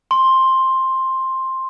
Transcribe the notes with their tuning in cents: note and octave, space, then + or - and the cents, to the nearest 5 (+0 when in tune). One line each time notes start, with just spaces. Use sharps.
C6 +10